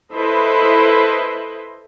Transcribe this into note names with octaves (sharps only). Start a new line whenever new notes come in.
E4 A4 B4 C5 D#5 E5